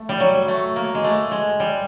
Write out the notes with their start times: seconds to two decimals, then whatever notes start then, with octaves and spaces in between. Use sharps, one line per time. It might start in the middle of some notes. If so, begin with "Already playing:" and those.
Already playing: A3
0.09 G3
0.20 F#3
0.48 A3
0.76 A#3
0.95 G#3
1.04 A3
1.31 G#3
1.60 G3